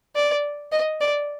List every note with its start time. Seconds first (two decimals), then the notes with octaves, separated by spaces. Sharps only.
0.16 D5
0.72 D#5
1.01 D5